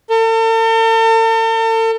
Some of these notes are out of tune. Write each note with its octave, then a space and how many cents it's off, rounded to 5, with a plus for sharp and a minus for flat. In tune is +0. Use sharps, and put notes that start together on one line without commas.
A4 +45